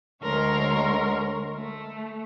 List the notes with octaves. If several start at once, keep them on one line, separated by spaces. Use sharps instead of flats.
D2 G#3 A#4 C#5 A#5 C6
A3